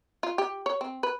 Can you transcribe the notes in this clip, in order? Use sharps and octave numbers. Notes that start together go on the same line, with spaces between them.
F4
G4
C#5
C4
B4